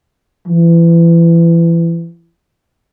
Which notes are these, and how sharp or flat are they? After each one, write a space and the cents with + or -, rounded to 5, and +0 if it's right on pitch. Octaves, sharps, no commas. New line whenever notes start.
E3 +30